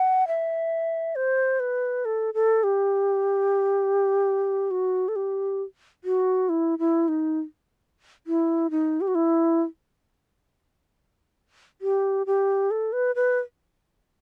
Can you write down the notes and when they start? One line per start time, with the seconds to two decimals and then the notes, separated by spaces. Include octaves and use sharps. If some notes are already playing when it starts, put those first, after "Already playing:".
Already playing: F#5
0.28 E5
1.16 C5
1.60 B4
2.05 A4
2.34 A4
2.64 G4
4.71 F#4
5.08 A4
5.16 G4
6.04 F#4
6.49 E4
6.79 E4
7.08 D#4
8.27 E4
8.71 D#4
9.01 G4
9.08 F#4
9.15 E4
11.82 G4
12.27 G4
12.71 A4
12.93 B4
13.16 B4